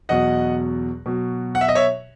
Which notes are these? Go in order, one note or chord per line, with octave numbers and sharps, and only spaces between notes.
E2 B2 F#3 D#5 F#5
B2 F#3
F#5
E5
D#5
C#5 E5